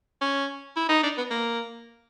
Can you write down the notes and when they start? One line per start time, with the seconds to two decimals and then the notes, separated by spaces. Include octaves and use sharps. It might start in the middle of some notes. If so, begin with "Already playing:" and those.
0.21 C#4
0.77 E4
0.89 D#4
1.03 D4
1.18 B3
1.31 A#3